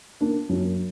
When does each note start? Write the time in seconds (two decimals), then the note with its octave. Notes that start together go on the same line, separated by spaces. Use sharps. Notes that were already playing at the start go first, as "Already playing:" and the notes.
0.21 A#3 D4
0.49 F#2